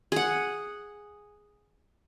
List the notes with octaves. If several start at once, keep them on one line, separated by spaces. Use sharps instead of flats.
G#4 F#5